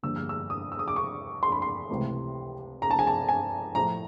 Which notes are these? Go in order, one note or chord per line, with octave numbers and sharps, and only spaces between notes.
G2 D3 F3 A#3 E6
F6
E6
D#6
E6
D#6
D6
C#6
C6
B5
C6
C#2 C3 E3 A3
A#5
A5
G#5
A5
G#5
A2 F3 A3 A#5